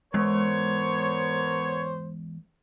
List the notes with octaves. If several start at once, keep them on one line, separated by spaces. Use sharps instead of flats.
E2 G#2 G#3 B3 A#4 C5 C#5